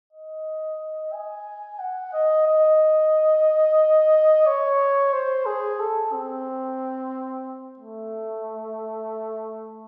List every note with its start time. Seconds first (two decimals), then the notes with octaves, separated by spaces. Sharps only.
0.13 D#5
1.13 G#5
1.79 F#5
2.13 D#5
2.47 D#5
4.46 C#5
5.13 C5
5.46 G#4
5.79 A4
6.13 C4
7.79 A3